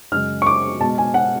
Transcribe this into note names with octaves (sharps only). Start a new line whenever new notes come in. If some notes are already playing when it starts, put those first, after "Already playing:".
F#2 C#3 G#3 F6
C#6
D6
B2 G#3 A5
G#5
F#5